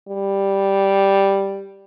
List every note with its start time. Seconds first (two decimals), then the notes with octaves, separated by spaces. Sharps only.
0.08 G3